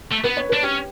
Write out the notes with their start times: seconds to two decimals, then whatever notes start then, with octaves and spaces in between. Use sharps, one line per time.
0.11 A3
0.24 B3 B4
0.37 C#5
0.49 D4 B4
0.63 C#4 G4